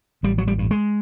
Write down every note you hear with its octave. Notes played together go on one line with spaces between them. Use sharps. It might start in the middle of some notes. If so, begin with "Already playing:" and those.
A1 G3
F#3
G3
G2
G#3